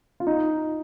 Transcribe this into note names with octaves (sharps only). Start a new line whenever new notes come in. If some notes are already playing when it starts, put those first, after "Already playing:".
F4
D#4